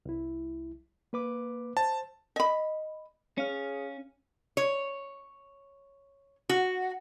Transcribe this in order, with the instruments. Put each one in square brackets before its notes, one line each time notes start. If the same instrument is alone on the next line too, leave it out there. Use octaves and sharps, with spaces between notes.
[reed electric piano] C2 E4
A#3 B4 D6
[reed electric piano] C5 [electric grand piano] A5
[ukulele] D#5 B5
[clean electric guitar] C#4 [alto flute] G#4 [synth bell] C#5 F5 F6
[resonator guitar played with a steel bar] C#5
F#4